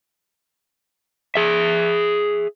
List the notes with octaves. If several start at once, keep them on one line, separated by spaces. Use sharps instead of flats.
G#4 E5